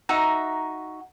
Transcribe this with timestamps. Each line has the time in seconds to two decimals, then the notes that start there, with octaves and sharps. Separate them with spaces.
0.09 D#4 F#4 E5 A#5